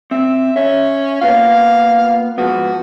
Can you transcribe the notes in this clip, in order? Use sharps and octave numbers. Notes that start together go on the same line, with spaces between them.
C4 E5
C#4 E5
A#3 B3 F4 F5
G#2 F3 B3 F#4